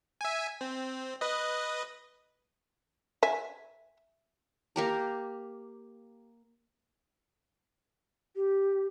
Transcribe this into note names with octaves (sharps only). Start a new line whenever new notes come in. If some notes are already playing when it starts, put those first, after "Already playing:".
E5 G#5
C4
B4 D#5
E5 G#5
A#3 G4 A#5
G4